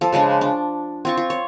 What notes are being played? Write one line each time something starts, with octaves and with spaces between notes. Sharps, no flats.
F3 A4
C#3 F3 G#3 D4
D4
C4 F4 C#6
F4
C#5